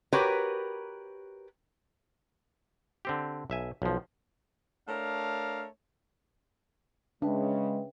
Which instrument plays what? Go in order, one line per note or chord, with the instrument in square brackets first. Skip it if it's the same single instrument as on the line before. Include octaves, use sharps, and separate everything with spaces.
[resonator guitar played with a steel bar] F#4 G4 A#4 B4 C#5
[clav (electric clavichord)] D3 C4 G4
B1 E5 G#5
B1 F3
[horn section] A3 D4 A#4 C#5 F5
[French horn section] C#3 [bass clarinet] G#3 [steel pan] D4 [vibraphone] B4 E5 G5